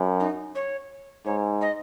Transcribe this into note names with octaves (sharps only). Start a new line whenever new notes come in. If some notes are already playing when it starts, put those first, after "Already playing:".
Already playing: F#2
D#4
C#5
G#2 C#5
D#5